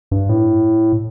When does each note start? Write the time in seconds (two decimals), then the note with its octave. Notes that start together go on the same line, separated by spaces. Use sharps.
0.11 G2
0.29 A2